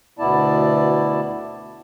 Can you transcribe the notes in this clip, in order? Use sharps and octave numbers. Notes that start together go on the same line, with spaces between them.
D2 B2 B3 E4 D5 A5